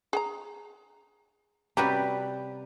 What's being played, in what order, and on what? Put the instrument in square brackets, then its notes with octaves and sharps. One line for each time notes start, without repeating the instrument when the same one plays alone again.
[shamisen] G#4 F#5 A#5
[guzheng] C3 G3 C4 [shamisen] C#4 F#4 A#5 [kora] G4 B4